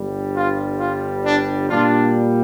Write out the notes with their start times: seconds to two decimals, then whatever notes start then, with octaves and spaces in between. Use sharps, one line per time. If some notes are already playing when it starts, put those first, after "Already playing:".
Already playing: G1 G2 G3
0.34 F4
0.79 F4
1.24 D4
1.70 A#2 G3 D4 F4